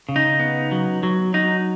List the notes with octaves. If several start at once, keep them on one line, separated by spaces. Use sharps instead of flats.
C#3
D#4
B3
F#3
F#3
F#3 D#4